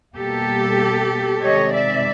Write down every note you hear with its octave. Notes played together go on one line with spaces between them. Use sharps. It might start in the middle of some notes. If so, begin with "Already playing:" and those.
B2 G3 A#3 G4 A4
C3 D#3 G#3 C#5 D#5
D5 E5